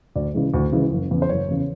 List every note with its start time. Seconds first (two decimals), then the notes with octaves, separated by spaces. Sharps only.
0.16 D2 D5
0.34 C#3 E3 G#3
0.54 D2
0.72 C#3 E3 G#3
0.91 F#1
1.11 E2 C#3
1.22 C5
1.29 F#1 C#5
1.48 E2 C#3